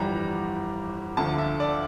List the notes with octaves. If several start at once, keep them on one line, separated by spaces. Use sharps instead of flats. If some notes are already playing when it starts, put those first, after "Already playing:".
Already playing: G1 F2 E3 G3 A#5
D2 D3 F3 A5
E5
D5